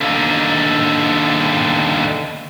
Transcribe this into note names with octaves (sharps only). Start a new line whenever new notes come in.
D#2 D3